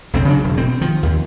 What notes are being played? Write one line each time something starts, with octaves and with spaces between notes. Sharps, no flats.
B1 F2 C4
C#3 F#3 D4
E1
B2 C4
D#3 F3
D#2